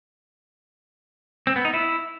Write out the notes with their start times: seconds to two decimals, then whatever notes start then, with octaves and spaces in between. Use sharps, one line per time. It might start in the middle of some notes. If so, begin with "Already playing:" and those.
1.47 C4
1.56 B3
1.65 D#4
1.74 E4